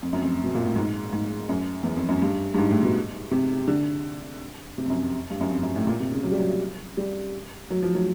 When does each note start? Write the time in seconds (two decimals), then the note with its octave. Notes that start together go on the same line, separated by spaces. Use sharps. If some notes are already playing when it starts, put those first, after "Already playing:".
0.02 F2
0.13 F#2
0.21 F2
0.43 B2
0.55 A#2
0.65 A2
0.76 G#2
1.13 G#2
1.49 F#2
1.83 E2
1.97 F2
2.09 F#2
2.22 G2
2.54 G2
2.58 G#2
2.71 A2
2.83 B2
3.31 C3
3.68 D3
4.78 C3
4.85 F2
4.90 F#2
5.03 F2
5.30 G2
5.41 F#2
5.51 F2
5.63 F#2
5.76 A2
5.87 A#2
6.00 C3
6.12 C#3
6.23 F#3
6.32 G3
6.39 F#3
6.97 G3
7.70 F#3
7.83 F3
7.95 F#3